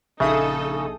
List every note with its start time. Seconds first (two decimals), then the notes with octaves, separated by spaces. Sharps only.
0.20 A#1 C#3 D#4 G#4 A4 E5 D#6